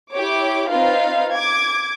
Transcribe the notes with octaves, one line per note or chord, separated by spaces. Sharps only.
E4 G4 C#5 D6
C4 D#4 F4 B4 F5
D6 G#6